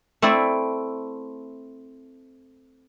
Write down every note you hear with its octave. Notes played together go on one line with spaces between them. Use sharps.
A3 C4 E4 D5